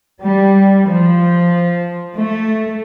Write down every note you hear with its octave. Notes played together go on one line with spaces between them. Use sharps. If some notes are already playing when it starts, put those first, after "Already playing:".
G3
F3
A3